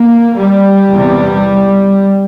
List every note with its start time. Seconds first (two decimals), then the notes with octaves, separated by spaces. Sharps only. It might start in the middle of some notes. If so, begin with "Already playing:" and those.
Already playing: A#3
0.37 G3
0.91 E2 C3